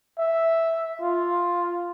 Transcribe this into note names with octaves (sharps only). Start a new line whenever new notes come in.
E5
F4